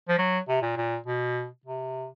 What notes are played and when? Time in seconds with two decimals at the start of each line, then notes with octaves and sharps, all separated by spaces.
0.09 F3
0.18 F#3
0.48 C3
0.62 A#2
0.77 A#2
1.06 B2
1.65 C3